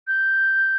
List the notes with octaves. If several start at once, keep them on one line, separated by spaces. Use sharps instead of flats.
G6